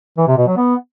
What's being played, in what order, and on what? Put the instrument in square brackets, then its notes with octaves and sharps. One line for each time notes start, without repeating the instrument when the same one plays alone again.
[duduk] E3
C3
B2
F#3
B3